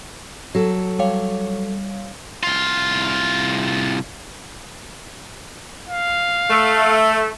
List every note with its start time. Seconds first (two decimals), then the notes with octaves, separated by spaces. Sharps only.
0.55 F#3 A4
0.99 G3 C#5 F5
2.43 C2 F4
5.89 F5
6.50 A3